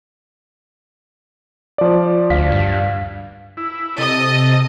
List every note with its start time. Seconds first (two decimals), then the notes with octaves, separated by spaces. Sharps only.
1.78 F3 D5
2.30 D2 F5 B6
2.52 G2
3.57 E4
3.98 C3 A4 D#5